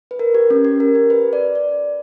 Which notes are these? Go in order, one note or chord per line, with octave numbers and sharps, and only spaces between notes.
B4
A#4
G4
C#4
G4
A#4
G4
B4
D5
D5